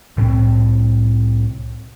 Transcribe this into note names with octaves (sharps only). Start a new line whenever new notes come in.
C2 A2 F3 C4